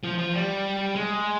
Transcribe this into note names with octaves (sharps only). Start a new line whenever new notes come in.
F3
F3
G3
G#3